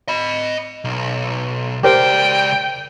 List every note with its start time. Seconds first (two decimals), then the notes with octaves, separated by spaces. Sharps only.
0.08 D#5 B5
0.85 B1
1.83 C#2 G4 A#4 C5 D5 G5